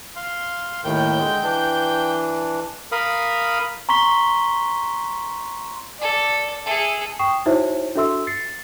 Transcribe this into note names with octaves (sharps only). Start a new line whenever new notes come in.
F5 C6
D#2 A2 D#3 G5 G6
D3 G#3
E3 D4
A#4 F5 B5 D#6
A#5 C6 C#6 B6 G7
A4 D5
G#4 A4 E5
G5 C#6 D#6 C7 E7
D#4 E4 F#4 C5 C#5 E5
D4 F#4 A4 E5 C6 E6
A6 C7 C#7